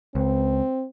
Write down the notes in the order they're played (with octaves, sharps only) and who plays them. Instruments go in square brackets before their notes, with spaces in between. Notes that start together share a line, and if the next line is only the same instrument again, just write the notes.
[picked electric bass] C#2 [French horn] C4